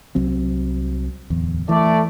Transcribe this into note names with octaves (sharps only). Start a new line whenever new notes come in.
C2 F#3 C4
D1 E2
E3 A3 D5